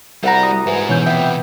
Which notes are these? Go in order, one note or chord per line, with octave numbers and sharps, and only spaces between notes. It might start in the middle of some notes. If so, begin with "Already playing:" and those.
C2 G3 E4 F#4 A#5
D#6
G#2 E3 G#3
B2 E3 C#4 G6
F2 C3 B3 E5 G5